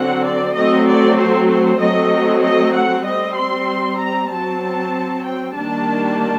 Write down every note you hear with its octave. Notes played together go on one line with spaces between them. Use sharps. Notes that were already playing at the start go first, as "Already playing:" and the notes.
Already playing: D3 F#3 C4 F#5
D5
F#3 A3 C4 D#5
D5
C5
C5
F#3 A3 C4 D#5
D#5
F#5
G3 C4 D#5
C6
A#5
F#3 C4 A5
G5
D#3 G3 A#3 D4 A5